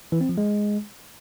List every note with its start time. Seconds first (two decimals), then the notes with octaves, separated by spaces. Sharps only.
0.12 E3
0.21 C4
0.29 F3
0.38 G#3